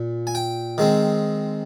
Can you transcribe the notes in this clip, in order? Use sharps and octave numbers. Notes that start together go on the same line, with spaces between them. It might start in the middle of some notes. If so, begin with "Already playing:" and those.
Already playing: A#2
G#5
G5
D#3 G#3 C4